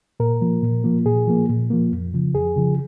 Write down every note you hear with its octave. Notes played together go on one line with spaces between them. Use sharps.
A#2 A#4
F3 A#3
A#2
F3 A#3
A#2 G#4
F3 A#3
A#2
F3 A#3
F2
C#3 F3
F2 G#4
C#3 F3